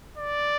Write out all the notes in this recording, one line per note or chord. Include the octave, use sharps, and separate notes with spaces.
D5